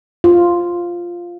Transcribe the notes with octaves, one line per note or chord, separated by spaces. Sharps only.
F4